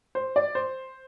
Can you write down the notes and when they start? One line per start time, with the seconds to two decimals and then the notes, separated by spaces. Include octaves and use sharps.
0.15 C5
0.36 D5
0.55 C5